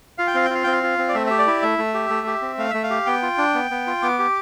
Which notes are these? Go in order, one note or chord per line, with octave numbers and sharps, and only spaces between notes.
F4 F5
G5
C4 F5
G5
F4 F5
C4 G5
F5
F4
C4
D5
A3 E5
G4 E5
D5
E4
A3 E5
A3
G4
A3
G4
C4
A3 F5
A3 E5
F5
G4
B3 G5
F4
D4
B3
B3
F4
B3 D6
G4